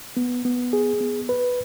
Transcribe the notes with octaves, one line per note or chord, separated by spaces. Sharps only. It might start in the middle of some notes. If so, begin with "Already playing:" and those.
B3
B3
G#4
B3
B4